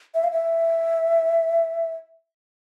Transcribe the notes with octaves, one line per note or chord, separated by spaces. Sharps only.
E5
F5
E5